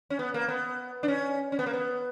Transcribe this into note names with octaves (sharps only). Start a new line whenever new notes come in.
C#4
B3
A#3
B3
D4
C#4
C#4
B3
A#3
B3